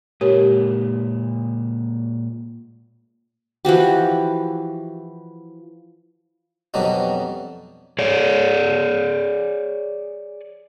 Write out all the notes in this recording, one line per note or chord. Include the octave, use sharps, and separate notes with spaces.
A#2 G#3 G4 A#4 C#5
E3 F3 F#4 G4
F2 B2 F#3 G3 D4 D#4
G#4 C#5 D5